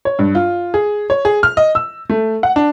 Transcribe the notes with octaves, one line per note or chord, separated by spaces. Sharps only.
C#5
G2
F4
G#4
C#5
G#4
F6
D#5
E6
A3
F#5
D4